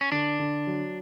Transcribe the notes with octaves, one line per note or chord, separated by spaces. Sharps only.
C#4
D3 D4
D3
F#3